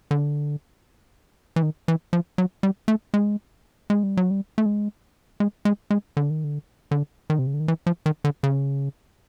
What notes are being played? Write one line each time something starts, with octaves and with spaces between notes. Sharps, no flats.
D3
E3
D#3
E3
F3
F#3
G3
A3
G#3
G#3
G3
F#3
G3
A3
G#3
G#3
G#3
G#3
D3
D#3
D3
D3
D#3
C3
C#3
D3
D#3
E3
F3
D#3
D3
C#3